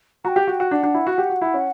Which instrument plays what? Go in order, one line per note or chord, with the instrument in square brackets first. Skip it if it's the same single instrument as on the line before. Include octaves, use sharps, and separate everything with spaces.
[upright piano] F#4 [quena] G5 A#5
[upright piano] G4
F#4
F#4
[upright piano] D4 [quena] F#5
[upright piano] D4
E4
F#4
G4
F#4
E4
C#4